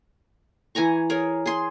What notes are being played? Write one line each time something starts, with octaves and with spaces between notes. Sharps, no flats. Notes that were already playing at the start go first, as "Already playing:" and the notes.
E3 G#5 A#5 C#6
G#4 A#4 C#5
G#4 C6